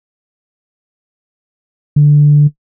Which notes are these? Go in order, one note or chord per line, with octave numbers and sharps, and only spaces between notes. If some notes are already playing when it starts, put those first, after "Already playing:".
D3